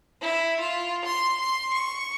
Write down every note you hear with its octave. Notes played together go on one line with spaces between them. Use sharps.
E4
F4
C6
C6
C#6